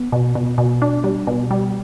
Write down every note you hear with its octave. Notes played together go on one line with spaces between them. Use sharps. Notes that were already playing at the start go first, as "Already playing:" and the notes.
Already playing: B3
B2
B2
B2
D4
G3
B2
G3